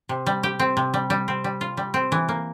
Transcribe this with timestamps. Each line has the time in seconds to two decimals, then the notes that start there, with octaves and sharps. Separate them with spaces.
0.09 C3
0.26 G3
0.43 G4
0.60 C4
0.77 C3
0.94 G3
1.10 G3
1.28 C4
1.44 G3
1.61 F4
1.77 G3
1.94 C4
2.12 E3
2.29 A#3